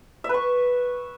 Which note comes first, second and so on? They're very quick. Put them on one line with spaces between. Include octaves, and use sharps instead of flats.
E5 B4 C#6